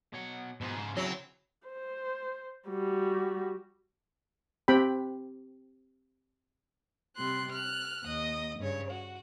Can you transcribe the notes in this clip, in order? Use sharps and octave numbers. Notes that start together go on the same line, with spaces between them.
B2 C#5 F#5
G#2 B2 F3 G#4
C#3 C5
F#3 C4 E4
C5
G3 F#4
C4 G4 G5 B5
C3 G3 C6 F#6
F6 F#6
D#2 D#5
G2 C#3 C#5
F#4